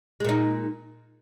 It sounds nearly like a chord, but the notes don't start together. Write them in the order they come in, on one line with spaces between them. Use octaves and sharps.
G#3 A#2 D#4